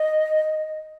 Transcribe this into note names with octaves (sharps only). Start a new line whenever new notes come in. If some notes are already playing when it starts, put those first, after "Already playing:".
Already playing: D#5